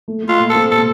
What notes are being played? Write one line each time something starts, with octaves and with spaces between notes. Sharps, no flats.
A3
A3
F4
A#2
A4
C4
A#2 A4